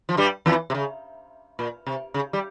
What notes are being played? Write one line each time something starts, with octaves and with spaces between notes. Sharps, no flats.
F3
G2 G3
E2 E3
C3
C#3
A#2
C3
C#3
G3